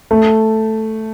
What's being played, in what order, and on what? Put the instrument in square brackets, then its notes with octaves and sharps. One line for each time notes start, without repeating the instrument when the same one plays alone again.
[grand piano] A3